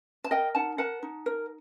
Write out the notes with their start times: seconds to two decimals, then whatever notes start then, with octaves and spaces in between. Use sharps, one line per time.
0.24 A5
0.31 A#4 D#5 G5
0.55 D#4 F#5 A5
0.78 A#4 F#5 A5
1.03 D#4
1.26 A#4